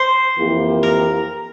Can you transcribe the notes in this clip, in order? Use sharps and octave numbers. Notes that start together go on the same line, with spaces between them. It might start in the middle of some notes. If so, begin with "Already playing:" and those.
Already playing: C5
F2 E3 A#3 E4 G4
A#4